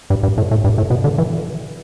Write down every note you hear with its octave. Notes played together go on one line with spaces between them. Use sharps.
G2
G2
A2
A2
G2
A2
B2
D3
E3